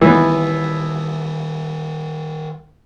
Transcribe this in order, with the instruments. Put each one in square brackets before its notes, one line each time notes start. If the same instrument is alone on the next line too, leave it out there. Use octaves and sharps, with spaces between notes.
[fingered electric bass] D#3 G3 [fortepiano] E3 B3